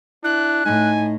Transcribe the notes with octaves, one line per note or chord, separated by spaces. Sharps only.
D4 E4 F#6
A2 D#4 G#5